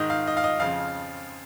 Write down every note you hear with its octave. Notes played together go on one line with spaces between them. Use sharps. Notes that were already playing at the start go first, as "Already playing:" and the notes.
Already playing: G#2 D#3 D#5
F5
D#5
F5
D#5
F2 C#3 F3 F5